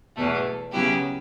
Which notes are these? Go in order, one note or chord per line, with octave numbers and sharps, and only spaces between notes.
E2 B2 A3
C#3 F#3 B3 E4 G4